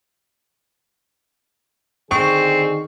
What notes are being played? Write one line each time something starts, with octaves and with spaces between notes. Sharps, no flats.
D3 D#3 C4 G#4 C#6